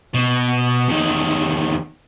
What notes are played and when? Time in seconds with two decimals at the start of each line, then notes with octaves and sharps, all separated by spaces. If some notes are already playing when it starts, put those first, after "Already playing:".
0.14 B2
0.88 E2 D#3